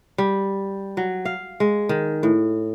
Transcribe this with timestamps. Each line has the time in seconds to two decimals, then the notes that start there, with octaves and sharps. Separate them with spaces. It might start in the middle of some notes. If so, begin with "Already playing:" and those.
0.18 G3
0.97 F#3
1.25 F5
1.60 G#3
1.89 D#3
2.23 A2